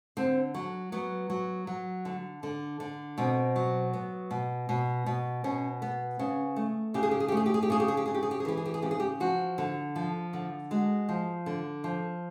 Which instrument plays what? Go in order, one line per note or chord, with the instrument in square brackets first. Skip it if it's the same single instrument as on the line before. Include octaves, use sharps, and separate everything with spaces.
[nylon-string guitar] D3 C4
F#3
F#3 B3
F#3
F#3
D3
D3
D3
B2 C4
F#3
B3
B2
B2
B2
B2 C#4
B3
C#3 C#4
A3
C#3 G4
G#4
G4
G#4
G4
A3 G#4
G4
G#4
G4
C#3 G#4
G4
G#4
G4
C#3 G#4
G4
G#4
G4
G#4
E3 G4
G#4
G4
G#4
C#3 G4
G#4
G4
F3 F#4
D3
F3
D3
G#3 F#4
F3
D3
F3